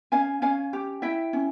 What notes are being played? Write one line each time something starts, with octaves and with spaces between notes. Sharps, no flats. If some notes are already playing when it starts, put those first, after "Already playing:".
C#4 F5 G#5
C#4 F5 G#5
G4
E4 E5 G5
C#4